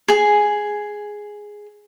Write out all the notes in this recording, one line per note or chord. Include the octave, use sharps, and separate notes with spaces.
G#4 G#5